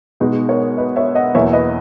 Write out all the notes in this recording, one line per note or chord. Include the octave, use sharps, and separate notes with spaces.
B2 G#3 B3 D#4
A#4 C#5
B4 D#5
C#5 E5
D#5 F#5
E2 B2 A#3 C#5 E5
B4 D#5